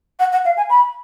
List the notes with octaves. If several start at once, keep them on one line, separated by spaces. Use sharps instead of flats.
F#5
F#5
F5
G#5
B5